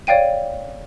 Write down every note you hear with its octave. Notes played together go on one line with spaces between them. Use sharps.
C#5 D5 F5 G5 D#7